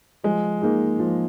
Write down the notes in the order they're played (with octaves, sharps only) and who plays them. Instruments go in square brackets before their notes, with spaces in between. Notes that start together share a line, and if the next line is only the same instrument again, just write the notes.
[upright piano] F3 [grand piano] G#3
[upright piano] A#3 D#4 G#4
F3